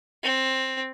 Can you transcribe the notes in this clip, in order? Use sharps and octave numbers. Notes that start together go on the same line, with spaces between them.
C4